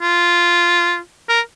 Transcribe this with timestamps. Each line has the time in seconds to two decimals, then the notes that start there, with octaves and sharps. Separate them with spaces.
0.01 F4
1.29 A#4